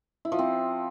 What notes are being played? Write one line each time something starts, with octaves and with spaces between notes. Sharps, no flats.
E4
F3
C4